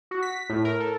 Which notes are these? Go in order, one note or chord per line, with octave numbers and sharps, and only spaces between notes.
F#4
B6
A2
A#4
A4